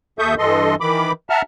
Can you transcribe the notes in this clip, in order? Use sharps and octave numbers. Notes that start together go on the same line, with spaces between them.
D#2 A4 E5 C#6 D#6 G6
G2 E3 A4 D#5 C6
D#3 E3 B5 D6
E5 F#5 A5 A#5 F6